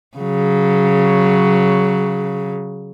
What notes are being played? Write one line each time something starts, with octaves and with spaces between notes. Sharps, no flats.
C#3 F#3